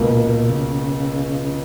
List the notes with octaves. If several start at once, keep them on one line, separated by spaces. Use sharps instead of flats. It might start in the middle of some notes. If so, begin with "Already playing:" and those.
Already playing: C#2 B2 A#3
A#2
A#2
C#3